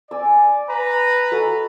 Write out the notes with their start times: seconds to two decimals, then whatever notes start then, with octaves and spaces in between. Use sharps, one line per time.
0.11 D5 G#5 E6
0.69 B4 A#5
1.31 F#4 A4 D#5